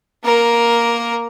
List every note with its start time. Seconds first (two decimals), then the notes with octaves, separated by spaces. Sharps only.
0.24 A#3 A#4